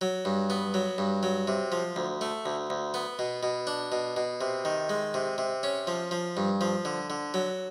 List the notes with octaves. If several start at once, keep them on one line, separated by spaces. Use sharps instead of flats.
F#3
G2
B3
F#3
G2
F#3
C3
F3
D2
A3
D2
D2
B3
B2
B2
D4
B2
B2
C3
D#3
G#3
C3
C3
C#4
F3
F3
G2
F3
D3
D3
F#3